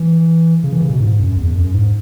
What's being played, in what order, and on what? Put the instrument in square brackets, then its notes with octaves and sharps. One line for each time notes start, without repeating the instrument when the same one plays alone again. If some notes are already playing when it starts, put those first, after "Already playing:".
Already playing: [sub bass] E3
C#3
E3
C#3
B2
G#2
F#2
E2
F#2
G#2